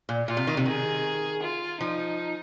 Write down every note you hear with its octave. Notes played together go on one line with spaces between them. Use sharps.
A#2
A#2 F4
C3
D#3
C3
D#3 G#4
F4
F3 D#4